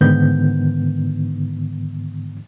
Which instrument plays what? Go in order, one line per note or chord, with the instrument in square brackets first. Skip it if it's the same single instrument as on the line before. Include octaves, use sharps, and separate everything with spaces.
[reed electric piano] G#2 D3 D#3 B3 G6